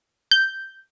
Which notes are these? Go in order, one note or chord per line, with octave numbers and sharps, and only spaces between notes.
G6